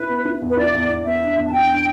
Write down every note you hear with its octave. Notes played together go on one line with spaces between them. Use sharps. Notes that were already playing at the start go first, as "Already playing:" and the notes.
Already playing: E4 B4
B3
E4
E2
B4
E4 D5
E2
E2
B3 E5
D4
E2
A5
E3 G5
D4